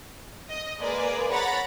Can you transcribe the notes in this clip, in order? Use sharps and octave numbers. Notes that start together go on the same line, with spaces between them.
D#5
G#3 A#3 G#4 B4 D5
C#5 F#5 A#5 B5 A6